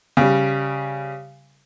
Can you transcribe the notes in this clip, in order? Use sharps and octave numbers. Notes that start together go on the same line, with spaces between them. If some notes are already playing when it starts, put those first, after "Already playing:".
C#3 G3